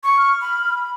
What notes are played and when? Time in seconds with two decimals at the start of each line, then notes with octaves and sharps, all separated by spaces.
0.04 C#6
0.18 F6
0.41 B5